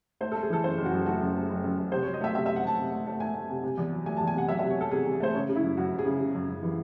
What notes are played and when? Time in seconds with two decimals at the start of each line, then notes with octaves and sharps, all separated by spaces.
0.21 A3 C5
0.32 A3 A4
0.43 G#4
0.50 E3 A4
0.64 F#1 C5
0.77 F#1
0.85 F#4
0.92 F#2
1.06 A3 F#4
1.21 F#2
1.35 A3
1.49 F#1
1.64 F#2
1.78 F#1
1.92 C3 C5
2.03 F#3 C#5
2.14 D#5
2.21 A3 E5
2.35 C3 E5
2.46 C3 E5
2.56 F#5
2.63 A3 A5
2.78 C3
2.92 A3
3.07 A3
3.20 A3 G#5
3.35 A3
3.49 C3
3.63 C3
3.77 E2
3.92 F#3
4.06 A3 G#5
4.17 E2 A5
4.27 G#5
4.34 C3 F#5
4.48 F#3 E5
4.59 C3 E5
4.70 C#5
4.77 F#3 A4
4.91 C3 G#4
5.06 C3
5.13 G#4
5.20 A3 C5
5.34 C#3 C#5
5.49 C#3
5.56 E4
5.63 F#2
5.77 F#2 F#4
5.92 F#2
5.99 G#4
6.05 C#3
6.20 C#3
6.34 F#2
6.49 F#2
6.63 E3